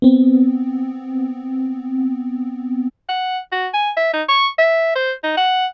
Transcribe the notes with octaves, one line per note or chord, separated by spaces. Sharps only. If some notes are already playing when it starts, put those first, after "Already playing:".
B3 C4
F#5
F#4
G#5
E5
D#4
C#6
E5
C5
D#4
F#5